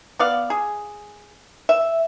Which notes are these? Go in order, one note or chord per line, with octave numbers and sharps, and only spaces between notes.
B3 D5 F5
G#4
E5